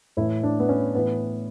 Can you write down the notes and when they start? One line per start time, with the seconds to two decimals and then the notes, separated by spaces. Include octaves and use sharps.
0.17 A2 E4
0.21 E3
0.43 D4
0.60 B3
0.69 C#4
0.95 A2 E3 B3